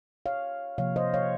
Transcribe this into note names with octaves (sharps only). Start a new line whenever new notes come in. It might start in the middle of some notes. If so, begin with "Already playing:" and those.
C#5 F5
C3 F3 A#3 C#5 F5
C5 D#5
C#5 F5